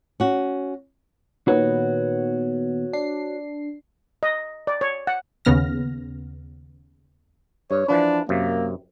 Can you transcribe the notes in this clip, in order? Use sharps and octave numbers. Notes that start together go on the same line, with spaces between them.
C#4 F#4
A#2 D#3 B3 F#4 C#5
D4 C7
D#5
D5
C#5
F#5
D#2 C#3 B3 F6 A#6
G2 C#5
E3 F3 D4 B4
F#2 C3 A#3